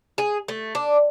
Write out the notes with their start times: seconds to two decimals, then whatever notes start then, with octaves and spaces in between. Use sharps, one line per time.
0.18 G#4
0.48 A3
0.75 D4